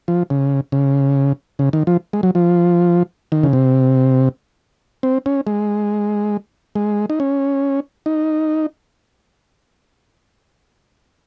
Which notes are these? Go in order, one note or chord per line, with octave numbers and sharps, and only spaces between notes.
F3
C#3
C#3
C#3
D#3
F3
G#3
F#3
F3
D#3
C#3
C3
C4
C#4
G#3
G#3
D#4
C#4
D#4